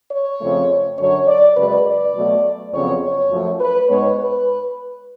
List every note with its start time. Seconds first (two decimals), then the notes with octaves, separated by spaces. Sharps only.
0.11 C#5
0.40 F2 C#3 F3 A3
0.98 F#2 D3 F#3 C#5
1.28 D5
1.56 F#2 C#3 G#3 B4
1.86 D5
2.14 B2 F#3 A3
2.73 F2 C#3 F#3 B3 C#5
3.02 C#5
3.30 F#2 F3 A3
3.60 B4
3.89 G#2 G#3 B3 C#5
4.18 B4